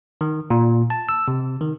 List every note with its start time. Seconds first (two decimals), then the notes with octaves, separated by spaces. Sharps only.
0.21 D#3
0.50 A#2
0.90 A5
1.09 E6
1.28 C3
1.61 D#3